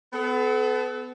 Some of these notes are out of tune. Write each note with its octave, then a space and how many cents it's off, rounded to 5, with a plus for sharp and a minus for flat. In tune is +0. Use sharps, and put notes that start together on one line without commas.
B3 +30 A4 -30